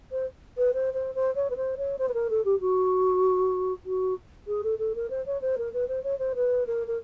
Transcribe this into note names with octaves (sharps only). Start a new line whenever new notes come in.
C5
B4
C5
C5
C5
C#5
B4
C5
C#5
C5
B4
A#4
A4
G4
F#4
F#4
G#4
A4
A4
A#4
C5
C#5
C5
A#4
B4
C5
C#5
C5
B4
A#4
A#4